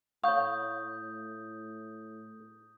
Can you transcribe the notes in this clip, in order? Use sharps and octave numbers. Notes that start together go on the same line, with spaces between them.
A2 C#5 F5 B5 C#6 D#6 G6